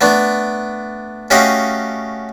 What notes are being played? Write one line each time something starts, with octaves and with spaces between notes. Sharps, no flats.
A3 B3 D4
A3 C#4 F#4 G4 D#5 F5